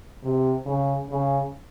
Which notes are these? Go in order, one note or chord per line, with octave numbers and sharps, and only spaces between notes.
C3
C#3
C#3